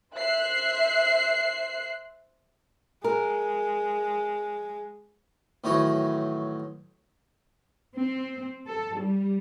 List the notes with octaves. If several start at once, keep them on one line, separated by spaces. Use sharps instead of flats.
C5 E5 F#6 C7
G#3 A#4
A1 A2 D#3 F#3 C#5 D#6
C4
A4
G3